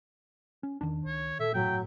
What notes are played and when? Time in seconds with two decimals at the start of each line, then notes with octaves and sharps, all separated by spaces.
0.63 C#4
0.81 E2 D#3 D4
1.06 C#2 C#5
1.39 A#2 A4 E5
1.54 G1 A2 F#3 G5